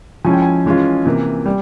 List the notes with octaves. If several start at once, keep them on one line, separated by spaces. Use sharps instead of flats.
F3 G#3 C#4 E4 G#5
G5
G#5
E3 G#3 C#4 F4
C3 E3 A#3
G3